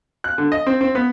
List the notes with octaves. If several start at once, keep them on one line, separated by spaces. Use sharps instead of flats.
F#6
D3
D#5
C4
C4
B3